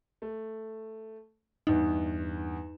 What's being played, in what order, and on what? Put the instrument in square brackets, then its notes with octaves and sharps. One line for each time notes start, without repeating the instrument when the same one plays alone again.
[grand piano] A3
[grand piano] E2 G2 [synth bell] D#4